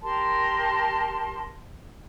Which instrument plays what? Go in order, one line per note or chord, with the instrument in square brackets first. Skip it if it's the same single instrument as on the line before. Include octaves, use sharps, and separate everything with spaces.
[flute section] G4 A#4 A5 C6